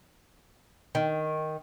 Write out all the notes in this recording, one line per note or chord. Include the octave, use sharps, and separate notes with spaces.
D#3